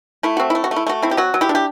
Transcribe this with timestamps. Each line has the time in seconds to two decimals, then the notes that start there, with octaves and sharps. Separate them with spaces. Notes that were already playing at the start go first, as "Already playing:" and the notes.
0.23 A3 E4
0.37 C4 F#4
0.50 A3 E4
0.64 F#4
0.71 A3
0.76 E4
0.87 A3 F#4
1.02 C4 E4
1.11 G4
1.17 F#3 F#4
1.34 F#3
1.41 E4 G4
1.49 D4
1.55 G4